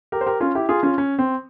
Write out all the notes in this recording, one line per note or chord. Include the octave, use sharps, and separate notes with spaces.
G4 A#4
C5
G4 A#4
C#4 F4
E4 G4
F4 G#4
C#4 F4
C#4
C4